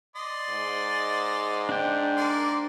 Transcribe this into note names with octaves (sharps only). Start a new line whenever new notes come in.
D5 D#5 C6
G#2
D4 G5
A#3 D5 C6